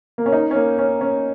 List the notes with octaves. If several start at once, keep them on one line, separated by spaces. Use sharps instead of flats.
A#3
C#4
D#4
C#4
A#3
C#4
C#4